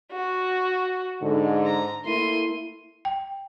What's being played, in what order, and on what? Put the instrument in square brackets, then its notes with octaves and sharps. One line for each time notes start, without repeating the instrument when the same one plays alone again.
[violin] F#4
[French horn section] G#2 D3
[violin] A#5
[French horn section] A3 A#3 E4 [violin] C6 D#7
[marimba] G5